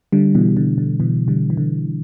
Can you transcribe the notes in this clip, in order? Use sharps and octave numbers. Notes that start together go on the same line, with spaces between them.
D3 G3
B2 E3
D3
D3
B2 E3
D3 G3
E3
D3